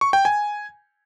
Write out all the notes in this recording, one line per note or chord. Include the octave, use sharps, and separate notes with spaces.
C#6
G5
G#5